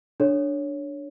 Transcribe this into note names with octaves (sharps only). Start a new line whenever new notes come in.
D4 A4 C#5